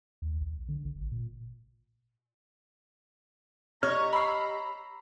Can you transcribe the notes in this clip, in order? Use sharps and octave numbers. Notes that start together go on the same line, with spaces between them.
D#2
B1
D3
B1
G#1
A#2
G4 C#5 D#5 A#5 F6
B5 E6 C7